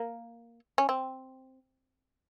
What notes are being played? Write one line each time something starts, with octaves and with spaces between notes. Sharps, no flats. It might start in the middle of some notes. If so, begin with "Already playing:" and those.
Already playing: A#3
C#4
C4